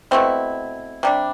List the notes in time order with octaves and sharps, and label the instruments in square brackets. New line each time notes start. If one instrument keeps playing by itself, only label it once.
[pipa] B2 A3 C4 E4
C3 G3 D4